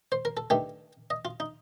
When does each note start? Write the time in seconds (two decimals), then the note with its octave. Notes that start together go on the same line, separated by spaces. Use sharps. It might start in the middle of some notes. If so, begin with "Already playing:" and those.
0.12 C5
0.25 A#4
0.37 A4
0.50 G2 D#3 A3 G4
1.10 D#5
1.25 F4
1.40 D#4